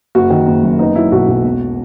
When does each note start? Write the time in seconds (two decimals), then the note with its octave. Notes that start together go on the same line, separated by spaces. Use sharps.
0.15 F#1 F#4
0.30 D#3
0.47 F#1
0.63 F#2
0.79 B3 D#4
0.95 F#3 E4
1.12 B1 F#4
1.28 B1
1.44 E1